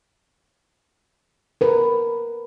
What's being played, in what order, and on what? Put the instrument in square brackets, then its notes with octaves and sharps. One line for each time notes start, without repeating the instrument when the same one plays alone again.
[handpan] A#4 B4